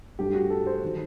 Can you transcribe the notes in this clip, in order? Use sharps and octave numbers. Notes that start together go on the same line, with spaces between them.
G2 F#3 A3 G4
F#4
A4
C5
D#3 F#3